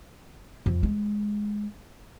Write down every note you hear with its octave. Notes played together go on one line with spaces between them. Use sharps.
F2
G#3